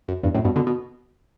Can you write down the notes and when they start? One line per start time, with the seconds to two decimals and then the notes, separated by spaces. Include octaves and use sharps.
0.08 F#2
0.23 E2 G2
0.34 F#2 A2
0.45 G2 B2
0.56 B2 D3
0.67 B2